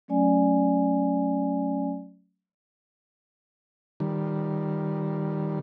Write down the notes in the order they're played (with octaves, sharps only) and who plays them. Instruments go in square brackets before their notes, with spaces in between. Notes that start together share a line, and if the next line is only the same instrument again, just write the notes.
[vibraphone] F#3 A3 C#4 D5 G#5
[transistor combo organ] D#3 G3